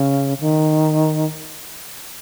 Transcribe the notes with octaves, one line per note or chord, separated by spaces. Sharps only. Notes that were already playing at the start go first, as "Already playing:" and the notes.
Already playing: C#3
D#3